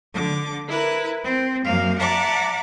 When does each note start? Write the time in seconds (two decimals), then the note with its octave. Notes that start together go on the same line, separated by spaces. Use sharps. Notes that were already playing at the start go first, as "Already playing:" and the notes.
0.14 D3 D6
0.67 E4 A#4 B4
1.23 C4
1.64 F#2 A#3 F5
1.99 D5 E5 F#5 A5 A#5 D6